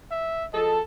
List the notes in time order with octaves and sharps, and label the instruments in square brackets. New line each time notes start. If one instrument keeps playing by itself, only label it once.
[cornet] E5
[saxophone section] F3 G#4 A4 [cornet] D#5